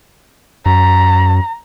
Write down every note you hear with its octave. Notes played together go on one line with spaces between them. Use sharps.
F#2 A#5